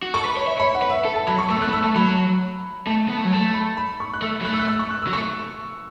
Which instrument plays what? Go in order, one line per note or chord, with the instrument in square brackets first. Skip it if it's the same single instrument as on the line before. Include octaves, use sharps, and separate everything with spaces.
[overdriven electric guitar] F#4
[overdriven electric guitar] A4 [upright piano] C#6
[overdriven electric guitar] B4
[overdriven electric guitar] C#5 [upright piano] B5
[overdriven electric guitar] E5
[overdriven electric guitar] C#5 [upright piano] B5
[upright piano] F#5
[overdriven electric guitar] B4
[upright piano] E5
[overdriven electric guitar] A4
[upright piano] A5
[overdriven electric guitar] F#3 [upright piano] B5
[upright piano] C#6
[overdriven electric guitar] A3 [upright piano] E6
[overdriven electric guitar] B3
[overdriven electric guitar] A3 [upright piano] F#6
[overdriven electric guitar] B3
[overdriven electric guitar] A3 [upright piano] E6
[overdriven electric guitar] A3 [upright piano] A5
[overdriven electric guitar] F#3 [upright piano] B5
[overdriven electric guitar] A3 [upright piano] A5
[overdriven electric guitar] B3
A3
F#3
[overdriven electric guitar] A3 [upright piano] A5
[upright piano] B5
B5
C#6
F#6
[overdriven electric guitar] A3 [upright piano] E6
[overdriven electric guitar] F#3
[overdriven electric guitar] A3 [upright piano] F#6
[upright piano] E6
F#6
E6
C#6
F#6
E6
[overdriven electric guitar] F#3
[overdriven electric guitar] A3 [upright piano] C#6